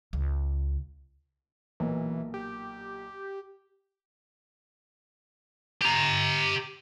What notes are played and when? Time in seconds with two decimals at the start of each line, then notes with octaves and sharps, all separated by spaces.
0.13 C#2
1.80 B1 A#2 E3 A#3
2.34 G4
5.82 G4 A#5